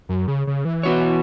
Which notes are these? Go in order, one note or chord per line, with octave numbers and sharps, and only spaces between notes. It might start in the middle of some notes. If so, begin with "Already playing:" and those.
F#2
C#3
C#3
E3
B3 F#4 C#5